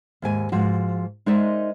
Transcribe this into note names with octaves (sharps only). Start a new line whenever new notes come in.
D#2 G#2 G#5
G#2 F3 F#4
G#3 D#4 A#4 C5 D5 E5